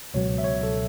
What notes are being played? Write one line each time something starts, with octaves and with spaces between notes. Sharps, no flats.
C#2 B2 F#3 C#5
E5
C#5
A4